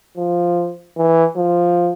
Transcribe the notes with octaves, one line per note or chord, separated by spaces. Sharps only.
F3
E3
F3